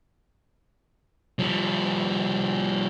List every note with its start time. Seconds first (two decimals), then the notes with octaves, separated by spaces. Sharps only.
1.39 F3 G3